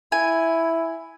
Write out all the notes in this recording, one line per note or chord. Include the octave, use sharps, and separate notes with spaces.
E4 G#5